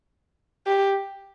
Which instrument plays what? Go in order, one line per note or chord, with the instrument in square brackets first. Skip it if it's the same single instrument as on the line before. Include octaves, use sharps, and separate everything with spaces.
[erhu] G4